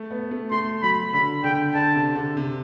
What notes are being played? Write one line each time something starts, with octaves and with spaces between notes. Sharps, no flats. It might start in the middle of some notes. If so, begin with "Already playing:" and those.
Already playing: A3
B3
A3
A3 C6
F#3 B5
D3 B5
D3 G5
D3 A5
C3
D3
C3